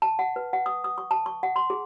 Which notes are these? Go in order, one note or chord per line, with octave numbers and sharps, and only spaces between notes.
A5
F#5
B4
F#5
D#6
D#6
C#6
A5
C#6
F#5
C6
G#4